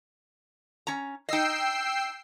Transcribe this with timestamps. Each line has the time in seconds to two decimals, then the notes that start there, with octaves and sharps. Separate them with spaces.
0.87 C#4 A#5
1.29 D#4 D#5 G5 E6 C7